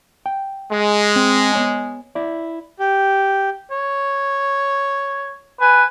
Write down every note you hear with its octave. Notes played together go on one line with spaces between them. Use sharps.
G5
G#3
C4
B3 C#5 G#5
E4 D5
G4
C#5
B4 G#5